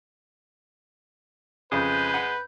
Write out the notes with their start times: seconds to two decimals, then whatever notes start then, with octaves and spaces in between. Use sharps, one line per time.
1.72 F2 C#3 G#3 B4 G6
2.14 F#5 B5